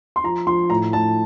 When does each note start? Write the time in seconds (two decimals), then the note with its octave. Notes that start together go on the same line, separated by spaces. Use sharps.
0.16 C6
0.24 F3 A#5
0.47 F3 C6
0.70 A2 A#5
0.93 A2 A5